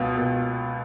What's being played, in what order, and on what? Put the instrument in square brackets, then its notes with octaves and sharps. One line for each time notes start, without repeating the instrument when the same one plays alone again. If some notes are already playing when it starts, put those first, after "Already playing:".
Already playing: [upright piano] C#2 B2 B3
B2